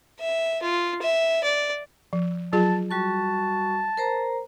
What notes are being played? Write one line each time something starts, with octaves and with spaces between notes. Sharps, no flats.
E5
F4
E5
D5
F3
F#3 F4 G#4 A5
G3 F#4 A5 C#6
A#4 C5 A#5